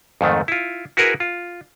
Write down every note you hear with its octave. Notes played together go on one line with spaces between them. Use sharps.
F2 G#2 D#3 A3
E4 F4
E4 F#4 G#4 A#4 B4
F4